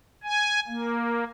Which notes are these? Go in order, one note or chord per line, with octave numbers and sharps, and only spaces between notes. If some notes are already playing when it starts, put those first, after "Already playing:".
G#5
A#3